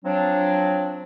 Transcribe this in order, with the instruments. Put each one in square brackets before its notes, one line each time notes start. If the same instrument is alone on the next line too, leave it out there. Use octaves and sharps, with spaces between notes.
[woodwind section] F3 F#3 C4 D4